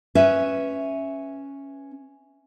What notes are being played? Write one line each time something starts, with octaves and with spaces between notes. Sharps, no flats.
C#4 B4 E5